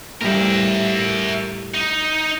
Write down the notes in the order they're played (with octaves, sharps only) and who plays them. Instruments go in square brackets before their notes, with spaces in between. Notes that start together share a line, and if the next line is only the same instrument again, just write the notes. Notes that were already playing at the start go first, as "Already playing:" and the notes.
[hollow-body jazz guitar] A2 G3 [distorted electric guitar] A#4 E5
[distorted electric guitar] D#4